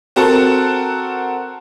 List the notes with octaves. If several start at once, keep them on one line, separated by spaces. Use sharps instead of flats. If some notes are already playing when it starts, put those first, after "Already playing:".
C4 F#4 A4 A#4 F#5 A5